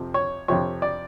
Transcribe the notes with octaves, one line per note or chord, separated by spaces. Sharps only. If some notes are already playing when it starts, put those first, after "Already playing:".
Already playing: F2 C3 F3
C#5
F2 C3 F3 C#5
D5